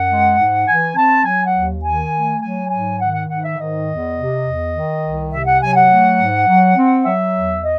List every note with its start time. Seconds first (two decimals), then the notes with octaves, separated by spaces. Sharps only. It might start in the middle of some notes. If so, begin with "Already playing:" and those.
Already playing: F#2 F#5
0.09 G#3
0.39 G#2
0.67 E3 G#5
0.96 C4 A5
1.25 F#3 G#5
1.45 F#5
1.54 D#2
1.83 D#3 G#5
2.13 A3
2.41 F#3 G#5
2.70 G#2 G#5
2.99 D#3 F#5
3.14 F#5
3.28 G#2 F#5
3.43 E5
3.57 D#3 D#5
3.87 E2
4.15 C3
4.44 E2
4.73 D#3
5.02 C2
5.31 C3 E5
5.46 F#5
5.60 F#3 G#5
5.76 F#5
5.89 A3
6.19 G#2
6.47 F#3
6.76 C4
7.05 F#3 E5
7.35 E2
7.63 D#5